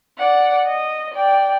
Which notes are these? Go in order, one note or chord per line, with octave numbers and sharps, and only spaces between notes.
D5 F#5
D#5
D5 G5